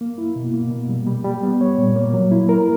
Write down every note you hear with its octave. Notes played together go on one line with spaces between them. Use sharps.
A#3
E4
B2
A#3
B2
G3
G3
G3
B3
C#5
A#2
A#3
F#3
E4
A#4